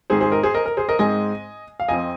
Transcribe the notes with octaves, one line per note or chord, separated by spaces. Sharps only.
G#2 D#3 C4 G#4 C5
G#4 C5
A#4 D#5
G#4 C5
A#4 D#5
A#4
G#4 C5
A#4 D#5
G#2 G#3 C4 D#5 G#5
F5
F2 F3 C4 D#5 G#5